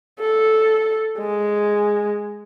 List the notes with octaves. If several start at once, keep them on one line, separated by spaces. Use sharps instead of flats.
A4
G#3